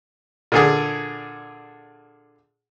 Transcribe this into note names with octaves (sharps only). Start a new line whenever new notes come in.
A#2 D3 G#4